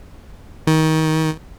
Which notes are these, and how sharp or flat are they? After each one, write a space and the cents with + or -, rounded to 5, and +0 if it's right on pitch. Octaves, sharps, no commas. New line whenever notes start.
D#3 +25